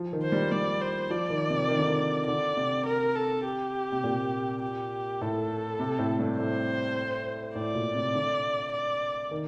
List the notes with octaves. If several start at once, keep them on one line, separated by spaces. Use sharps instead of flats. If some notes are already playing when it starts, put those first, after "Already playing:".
Already playing: F3
D#3
C5
G3
G3 D5
C5
F3 D5
D#3
C3
D#3
D3
D#3
D3 D5
C3
A#4
A4
G4
C3
A#2
G4
A2 A4
C3
A2
G2
A2 C5
A2 D5
A#2
C3
D3
D5
D#3